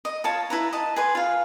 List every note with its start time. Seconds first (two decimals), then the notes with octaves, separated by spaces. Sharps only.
0.05 D#5
0.24 F4 C#5 A5
0.50 E4 B4 A#5
0.73 D#5 A5
0.96 G#4 B4 C6
1.15 F4 F5